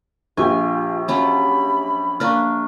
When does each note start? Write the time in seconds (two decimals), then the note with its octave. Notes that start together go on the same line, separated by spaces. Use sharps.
0.37 A#1 F4 G4 G#5 C#6
1.08 F#3 C#4 F4 B5
2.20 A#3 D4 B4 C#6 F6